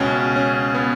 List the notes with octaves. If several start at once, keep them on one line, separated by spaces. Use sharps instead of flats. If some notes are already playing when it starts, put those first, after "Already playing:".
Already playing: C#2 B2 C#4
C#4
B3